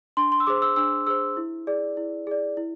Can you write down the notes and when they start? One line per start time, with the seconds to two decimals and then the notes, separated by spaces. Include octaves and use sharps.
0.17 D4 C6
0.32 C6
0.40 E6
0.47 G#4 C5 D6
0.62 E6
0.76 D4 E6
1.07 G#4 C5 E6
1.37 E4
1.67 G#4 D5
1.97 E4
2.27 G#4 D5
2.57 E4